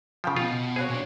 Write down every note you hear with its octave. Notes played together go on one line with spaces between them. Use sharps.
C#3 F3 F5 G5
B2 F4
C4 F#4 G#4 C#5
A#2 D4